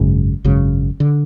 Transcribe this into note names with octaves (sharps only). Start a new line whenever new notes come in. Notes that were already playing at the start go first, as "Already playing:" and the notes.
Already playing: G#1 F#2 C#3
G#1 F#2 C#3
D3